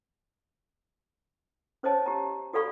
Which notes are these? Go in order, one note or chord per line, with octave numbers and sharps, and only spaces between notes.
C#4 C5 C#5 D#5 A5
G4 A#5
F#4 A4 D5 F5 B5 C#6